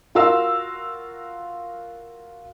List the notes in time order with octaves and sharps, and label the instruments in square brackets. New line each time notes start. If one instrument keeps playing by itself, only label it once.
[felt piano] F4 F#4 A#4 F5 E6